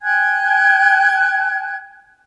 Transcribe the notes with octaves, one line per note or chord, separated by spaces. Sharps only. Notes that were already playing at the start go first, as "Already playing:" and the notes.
G5 G#5 F#6 G#6